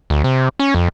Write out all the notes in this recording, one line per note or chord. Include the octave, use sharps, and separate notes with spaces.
D2
C3
C#4
F2